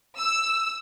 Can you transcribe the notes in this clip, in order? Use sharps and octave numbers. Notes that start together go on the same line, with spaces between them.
E6